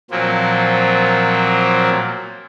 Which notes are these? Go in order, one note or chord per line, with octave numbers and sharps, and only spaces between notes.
A#2 F3 F#3 A#3 C4